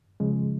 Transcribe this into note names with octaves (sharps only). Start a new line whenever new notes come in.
C#3 F3 G#3